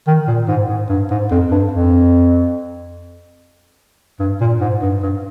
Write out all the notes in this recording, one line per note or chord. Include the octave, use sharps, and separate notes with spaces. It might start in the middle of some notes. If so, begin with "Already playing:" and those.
D#3
A#2
G#2
G#2
G2
G#2
F2
G2
F2
G2
A#2
G#2
G2
G2